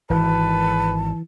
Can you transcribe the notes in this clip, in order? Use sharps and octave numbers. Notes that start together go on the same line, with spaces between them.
G#1 E3 B4 A5